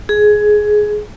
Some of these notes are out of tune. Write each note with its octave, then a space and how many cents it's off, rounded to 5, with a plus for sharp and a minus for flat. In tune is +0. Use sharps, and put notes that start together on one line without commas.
G#4 +15